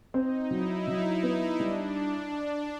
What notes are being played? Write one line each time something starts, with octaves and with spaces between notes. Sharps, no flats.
C4 D#4
F#3 E4
F#3 D#4
B3
G3 D4